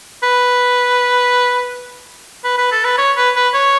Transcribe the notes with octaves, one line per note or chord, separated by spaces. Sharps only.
B4
B4
B4
A4
B4
C#5
B4
B4
C#5